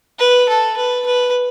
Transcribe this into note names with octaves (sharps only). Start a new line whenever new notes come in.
B4
A4
B4
B4